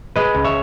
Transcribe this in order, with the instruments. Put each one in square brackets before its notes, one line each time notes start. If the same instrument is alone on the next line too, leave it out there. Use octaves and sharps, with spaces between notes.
[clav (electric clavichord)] G#3 B4 D#5
C#2
C#5 E5